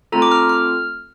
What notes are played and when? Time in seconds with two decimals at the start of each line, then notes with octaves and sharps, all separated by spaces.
0.12 A3 C4 F4 A4 A#5
0.22 D6
0.32 F6
0.49 F6